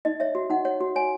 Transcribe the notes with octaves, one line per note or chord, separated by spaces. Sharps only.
D#4 D#5
C#5 E5
F#4
D#4 F#5
C#5 F#5
F#4
C#5 G#5